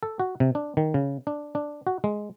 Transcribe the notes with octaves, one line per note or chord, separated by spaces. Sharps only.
A4
F#4
C3
D4
D#3
C#3
D4
D4
F#4
G#3